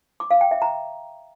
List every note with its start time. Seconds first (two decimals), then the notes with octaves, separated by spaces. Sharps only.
0.20 D6
0.31 F5
0.41 G5
0.51 E5
0.62 A#5